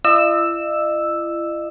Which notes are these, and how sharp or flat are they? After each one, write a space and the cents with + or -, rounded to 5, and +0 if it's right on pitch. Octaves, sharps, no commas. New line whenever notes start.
E4 +45 D#5 -40 E6 +0